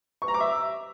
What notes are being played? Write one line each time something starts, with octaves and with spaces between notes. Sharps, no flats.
C#6
A#5
D6
E5